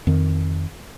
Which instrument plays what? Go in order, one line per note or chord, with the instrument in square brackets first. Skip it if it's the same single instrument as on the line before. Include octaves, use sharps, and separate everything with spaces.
[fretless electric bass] F2 D#3